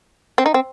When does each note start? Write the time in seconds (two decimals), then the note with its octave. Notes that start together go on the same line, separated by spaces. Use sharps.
0.38 C4
0.46 D#4
0.54 C4